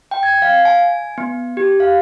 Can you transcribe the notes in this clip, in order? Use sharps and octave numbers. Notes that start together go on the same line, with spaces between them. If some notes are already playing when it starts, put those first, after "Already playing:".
G5
G#6
F5
G#5
B3
G4
F5